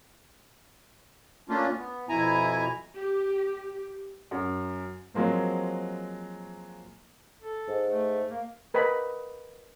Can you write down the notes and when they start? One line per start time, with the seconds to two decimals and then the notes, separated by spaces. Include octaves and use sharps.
1.49 A3 A#3 C#4 D4 F4
1.78 B3
2.09 F2 B2 E4 G#5 A#5
2.95 G4
4.31 F#2
5.14 F3 F#3 G#3 A#3 C4
7.42 A4
7.68 G#2
7.90 A3
8.30 A#3
8.74 A#4 B4 D#5 G5 B5